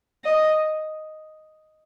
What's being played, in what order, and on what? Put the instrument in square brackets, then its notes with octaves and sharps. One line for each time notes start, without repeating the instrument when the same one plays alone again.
[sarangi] D#5